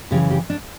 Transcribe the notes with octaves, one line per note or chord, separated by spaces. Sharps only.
F#2 C#3 E3 G4
G4
D4